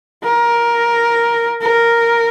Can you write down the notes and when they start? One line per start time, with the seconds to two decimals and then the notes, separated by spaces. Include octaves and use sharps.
0.24 A#4
1.62 A#4